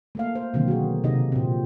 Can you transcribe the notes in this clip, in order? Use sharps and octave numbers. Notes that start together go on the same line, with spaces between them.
A3 A#3 F5
C5
B2 D3 D#3 F#3 A#3 C4
F#4 G#4
C3 D#4 G4 D#5
A#2 C4